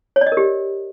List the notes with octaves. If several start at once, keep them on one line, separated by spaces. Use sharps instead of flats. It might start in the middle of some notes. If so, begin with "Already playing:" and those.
C#5
D5
D#5
A#4
G4